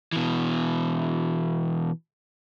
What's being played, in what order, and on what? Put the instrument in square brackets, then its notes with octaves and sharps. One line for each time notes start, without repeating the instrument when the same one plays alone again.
[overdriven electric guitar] B2 E3